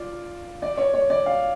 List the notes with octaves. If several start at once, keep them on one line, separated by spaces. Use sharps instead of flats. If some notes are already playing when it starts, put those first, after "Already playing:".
Already playing: F4 D5
D5
C#5
C#5
D5
F5